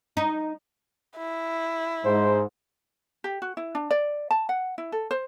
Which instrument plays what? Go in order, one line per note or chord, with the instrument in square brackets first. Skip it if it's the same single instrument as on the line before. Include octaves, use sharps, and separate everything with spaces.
[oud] D#4
[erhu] E4
[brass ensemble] G#2 [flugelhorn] C5
[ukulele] G4
F#4
E4
D4
D5
A5
F#5
E4
A4
C5